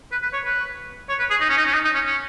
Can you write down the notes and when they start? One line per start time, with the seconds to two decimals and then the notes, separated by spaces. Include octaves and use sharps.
0.12 B4
0.22 B4
0.33 C#5
0.44 B4
1.09 C#5
1.19 B4
1.30 G#4
1.40 D#4
1.49 C#4
1.57 D#4
1.66 C#4
1.73 D#4
1.85 D#4
1.94 C#4
2.06 C#4